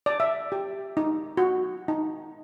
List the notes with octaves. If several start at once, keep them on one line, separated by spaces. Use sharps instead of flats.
D5
E5
G4
D#4
F#4
D#4